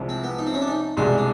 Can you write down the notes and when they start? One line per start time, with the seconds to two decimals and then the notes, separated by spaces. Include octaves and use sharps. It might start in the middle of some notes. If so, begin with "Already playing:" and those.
Already playing: C2 C3 F3 G#3
0.09 C4
0.24 B3
0.39 D#4
0.47 C4
0.54 C#4
0.61 D4
0.68 D#4
0.97 C2 B2 G#3 D4
1.18 D4